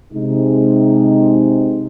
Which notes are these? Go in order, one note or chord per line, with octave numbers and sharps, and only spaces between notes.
C3 G#3 D#4